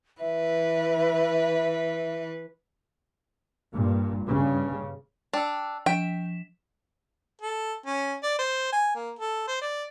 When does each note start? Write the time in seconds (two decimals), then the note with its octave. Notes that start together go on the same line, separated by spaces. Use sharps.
0.20 E3 B4 E5
3.73 G2 A#2
4.25 G2 C#3
5.33 D4 G5 E6
5.86 F3 G5 B6 E7
7.41 A4
7.86 C#4
8.23 D5
8.39 C5
8.73 G#5
8.95 A#3
9.19 A4
9.48 C5
9.61 D5